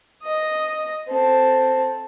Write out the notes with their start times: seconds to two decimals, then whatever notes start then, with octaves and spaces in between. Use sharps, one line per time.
0.23 D#5 D#6
1.08 C4 A4